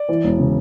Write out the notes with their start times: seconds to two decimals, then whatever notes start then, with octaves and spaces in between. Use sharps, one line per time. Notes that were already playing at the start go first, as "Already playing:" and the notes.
Already playing: D5
0.09 E3
0.24 E1
0.39 C#3